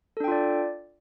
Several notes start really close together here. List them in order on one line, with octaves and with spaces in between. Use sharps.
A4 D4 G5 F4 D5